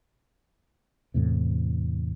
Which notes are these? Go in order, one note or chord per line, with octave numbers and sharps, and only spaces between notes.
E2 A2 C3